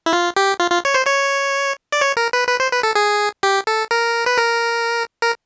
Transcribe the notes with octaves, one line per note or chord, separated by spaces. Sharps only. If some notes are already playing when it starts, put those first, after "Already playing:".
E4
F4
G4
F4
F4
C#5
C5
C#5
D5
C#5
A#4
B4
B4
C5
B4
A4
G#4
G4
A4
A#4
B4
A#4
A#4